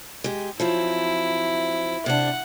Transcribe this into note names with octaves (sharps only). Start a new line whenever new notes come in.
G#3 G4
F3 F#3 C4 E4
C3 D4 F#5